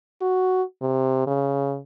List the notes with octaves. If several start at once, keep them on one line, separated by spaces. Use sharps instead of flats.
F#4
C3
C#3